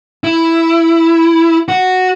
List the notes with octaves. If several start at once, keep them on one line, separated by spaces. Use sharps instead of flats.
E4
F#4